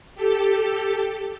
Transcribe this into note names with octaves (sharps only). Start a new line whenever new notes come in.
G4 A4